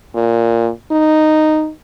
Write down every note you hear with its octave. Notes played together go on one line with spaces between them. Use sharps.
A#2
D#4